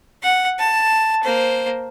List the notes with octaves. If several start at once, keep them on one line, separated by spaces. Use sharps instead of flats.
F#5
A5
A#3 C5